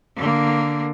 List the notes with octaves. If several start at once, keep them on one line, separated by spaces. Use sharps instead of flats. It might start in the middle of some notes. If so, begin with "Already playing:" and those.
D3 A#3